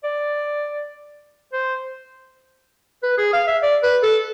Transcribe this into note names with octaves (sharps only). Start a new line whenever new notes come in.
D5
C5
B4
G#4
F5
E5
D5
B4
A4